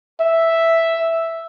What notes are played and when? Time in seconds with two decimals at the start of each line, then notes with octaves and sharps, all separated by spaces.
0.20 E5